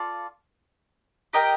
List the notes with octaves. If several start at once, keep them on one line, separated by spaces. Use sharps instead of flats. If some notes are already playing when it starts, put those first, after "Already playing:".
Already playing: F4 A4 D5 F5
G4 A#4 D#5 G5